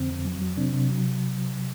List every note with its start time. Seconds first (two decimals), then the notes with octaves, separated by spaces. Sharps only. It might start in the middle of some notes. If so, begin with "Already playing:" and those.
Already playing: F2 D3 C4
0.10 F2
0.25 F#3
0.41 F#3
0.57 C3 C4 D4
0.74 C3
0.89 F#3